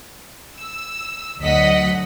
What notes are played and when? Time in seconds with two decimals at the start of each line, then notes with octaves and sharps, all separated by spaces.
0.58 E6
1.39 D2 F#3 D#5 F#5 B6